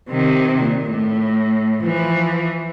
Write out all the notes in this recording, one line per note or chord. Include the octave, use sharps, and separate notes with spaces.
C3 D#3
A#2
A2
E3 F3